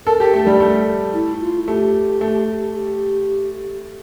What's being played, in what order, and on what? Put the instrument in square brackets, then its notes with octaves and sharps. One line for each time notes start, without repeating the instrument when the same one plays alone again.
[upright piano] A4 [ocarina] A#4
[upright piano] G4 [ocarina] A#4
[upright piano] A3 [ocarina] A4
[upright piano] G3 [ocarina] G4
[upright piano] A3
[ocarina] E4
F4
[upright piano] A3 [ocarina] G4
[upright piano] A3
[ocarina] G4